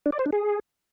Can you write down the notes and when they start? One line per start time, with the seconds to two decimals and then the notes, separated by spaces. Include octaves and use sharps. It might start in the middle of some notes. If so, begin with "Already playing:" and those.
0.06 D4
0.12 D5
0.19 C5
0.26 D4
0.33 G#4